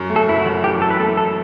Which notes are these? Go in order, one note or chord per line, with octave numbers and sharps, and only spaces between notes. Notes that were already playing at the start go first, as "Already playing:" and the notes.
Already playing: F#2
A3
A4
F#1 E4
F#4
F#2
E3 G4
E3 A4
B4
A3 A4
E3 A4